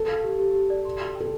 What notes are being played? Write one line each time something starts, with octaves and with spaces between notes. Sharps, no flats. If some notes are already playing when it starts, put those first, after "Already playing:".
Already playing: A4
F5
G4
G4
G4
D5
C6
C6
G5
A4